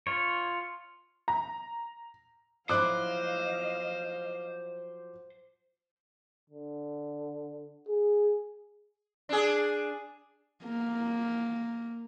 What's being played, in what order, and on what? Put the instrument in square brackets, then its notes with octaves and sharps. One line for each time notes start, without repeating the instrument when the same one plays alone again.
[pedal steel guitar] F4 C#5
[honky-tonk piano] A#5
[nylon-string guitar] F3 F#3 E4 [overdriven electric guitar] C5 [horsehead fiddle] D#5 F5 [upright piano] D6 F#6
[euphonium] D3
G#4
[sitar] D4 G#4
[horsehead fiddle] A#3